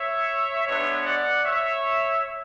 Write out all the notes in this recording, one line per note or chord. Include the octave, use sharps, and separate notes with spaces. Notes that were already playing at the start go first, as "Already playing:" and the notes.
Already playing: C#5 E5
G#3 B3 D4 C#5 E5
D5 F#5
C#5 E5